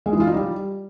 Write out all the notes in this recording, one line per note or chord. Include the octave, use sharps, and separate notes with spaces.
G#3
E3
F4
D#4
G3